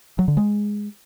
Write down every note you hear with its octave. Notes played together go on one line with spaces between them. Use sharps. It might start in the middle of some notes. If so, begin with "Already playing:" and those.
F#3
D3
G#3